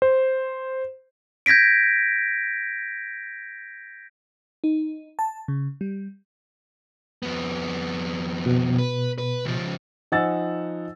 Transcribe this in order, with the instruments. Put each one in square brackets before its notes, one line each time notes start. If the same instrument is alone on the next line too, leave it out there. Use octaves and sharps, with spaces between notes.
[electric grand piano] C5
[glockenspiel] G6 G#6 A#6 B6 D7
[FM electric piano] D#4
A5
C#3
G3
[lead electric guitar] F2 B3
[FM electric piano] B2
[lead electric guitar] B4
B4
C#2 F3
[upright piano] F3 D#4 F#5 G#5 E6 A6